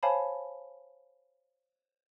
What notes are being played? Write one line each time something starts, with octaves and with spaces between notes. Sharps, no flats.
C5 C#5 F5 G#5 A5 B5